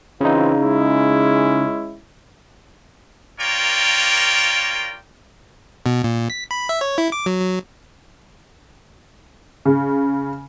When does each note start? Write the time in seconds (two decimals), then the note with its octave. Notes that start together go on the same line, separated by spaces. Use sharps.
0.21 C#3 E3 C4 D#4 F4
0.60 G#3 C#4 E4
3.40 A#3 F4 A#4 C#5 D5 G5
5.86 B2
6.04 A#2
6.30 B6
6.51 B5
6.69 E5
6.81 C#5
6.98 E4
7.12 D6
7.26 F#3
7.41 F#3
9.65 C#3